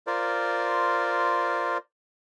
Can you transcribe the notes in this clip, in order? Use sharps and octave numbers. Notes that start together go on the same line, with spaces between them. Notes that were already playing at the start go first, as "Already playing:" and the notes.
F4 A#4 C5 D5